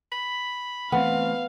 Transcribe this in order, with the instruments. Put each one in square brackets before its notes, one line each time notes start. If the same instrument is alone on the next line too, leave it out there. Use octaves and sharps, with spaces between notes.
[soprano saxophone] B5
[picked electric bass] E3 A3 C4 [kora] B3 [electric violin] F5